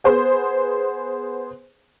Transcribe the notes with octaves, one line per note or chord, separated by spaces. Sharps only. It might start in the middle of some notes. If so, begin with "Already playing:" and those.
B3 G#4 C5